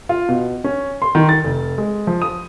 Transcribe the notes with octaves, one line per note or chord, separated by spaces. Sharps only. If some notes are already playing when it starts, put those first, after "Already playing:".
F4
B2
C#4
C6
D#3
A6
F1
G#3
F3
D#6